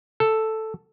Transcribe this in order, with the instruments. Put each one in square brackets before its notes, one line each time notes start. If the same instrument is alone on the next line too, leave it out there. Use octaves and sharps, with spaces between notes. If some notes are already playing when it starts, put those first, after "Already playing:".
[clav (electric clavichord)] A4